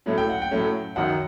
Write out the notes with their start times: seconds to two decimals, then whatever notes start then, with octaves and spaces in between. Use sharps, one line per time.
0.06 A2 F#3 A3 C#4
0.18 G5
0.30 F#5
0.42 G5
0.51 A2 F#3 A3 C#4
0.96 F#2 D#3 F#3 F#5